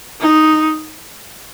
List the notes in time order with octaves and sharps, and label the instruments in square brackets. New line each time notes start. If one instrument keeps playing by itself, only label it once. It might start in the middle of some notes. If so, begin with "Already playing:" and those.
[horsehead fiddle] D#4